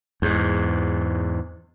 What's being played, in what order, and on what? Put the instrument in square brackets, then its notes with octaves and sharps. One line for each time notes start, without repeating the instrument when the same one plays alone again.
[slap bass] E2 G#2